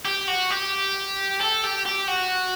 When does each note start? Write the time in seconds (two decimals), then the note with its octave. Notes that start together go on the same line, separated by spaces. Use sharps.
0.05 G4
0.28 F#4
0.51 G4
1.40 A4
1.64 G4
1.85 G4
2.08 F#4